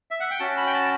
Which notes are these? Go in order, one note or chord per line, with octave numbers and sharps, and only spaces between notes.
E5
F#5
G5
C#4 F#4 A5
B5
G5
A5